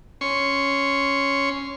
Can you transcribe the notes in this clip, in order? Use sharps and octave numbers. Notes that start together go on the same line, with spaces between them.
C#4 C6 C#6